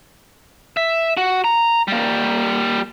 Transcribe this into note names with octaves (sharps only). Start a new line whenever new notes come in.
E5
F#4
A#5
G3 A#3